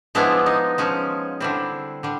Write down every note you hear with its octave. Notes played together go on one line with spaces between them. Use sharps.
F3 G#3 B3 D4 E4
D#4
F3 G#3 C#4
D3 G3 C4 E4
D3 G3